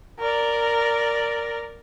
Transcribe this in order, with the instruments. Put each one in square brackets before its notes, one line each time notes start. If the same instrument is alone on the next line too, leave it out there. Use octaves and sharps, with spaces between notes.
[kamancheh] A#4 D5